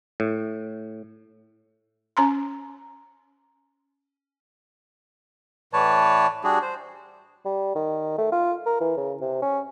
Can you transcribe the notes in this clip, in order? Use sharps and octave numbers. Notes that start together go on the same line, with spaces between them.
A2
C#4 A#5 C6
A2 E3 B4 C#5 D5 A5
G3 D4 F#4 G#4
C5
G3
D#3
A3
F4
A#4
E3
C#3
C3
C#4